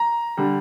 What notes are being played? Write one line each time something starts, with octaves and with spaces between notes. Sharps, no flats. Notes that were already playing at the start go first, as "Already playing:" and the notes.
Already playing: A#5
D3 G3